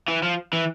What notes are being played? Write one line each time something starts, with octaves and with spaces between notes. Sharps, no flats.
E3
F3
E3